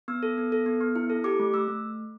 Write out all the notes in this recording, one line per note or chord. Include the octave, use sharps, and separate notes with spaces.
B3 E6
A4
B3
A4
B3
B3
E4
A4
G4 D6
A3
A3 E6
A3